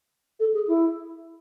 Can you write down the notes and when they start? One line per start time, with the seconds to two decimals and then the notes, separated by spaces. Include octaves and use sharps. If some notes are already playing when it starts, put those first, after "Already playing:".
0.40 A4
0.54 G#4
0.68 E4